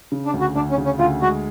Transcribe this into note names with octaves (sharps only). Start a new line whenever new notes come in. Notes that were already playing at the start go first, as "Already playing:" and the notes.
C#3
D4
D2
F#4
D2 D4
C#4
C#3
C#4
D2 F4
G#3 F#4